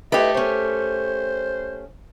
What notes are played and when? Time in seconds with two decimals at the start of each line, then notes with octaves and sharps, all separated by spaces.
0.12 A3 E4 F4 G4 B4 D#5
0.34 C#4 C5 C#5